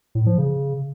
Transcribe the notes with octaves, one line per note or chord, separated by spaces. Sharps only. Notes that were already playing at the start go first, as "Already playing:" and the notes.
A2
F3
C#3